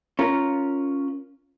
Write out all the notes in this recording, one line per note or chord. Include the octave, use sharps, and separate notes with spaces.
C#4 F4 A#4